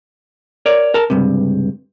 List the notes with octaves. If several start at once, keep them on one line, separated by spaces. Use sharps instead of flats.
A#4 C#5 D5
A#4 A5
C#2 G2 C3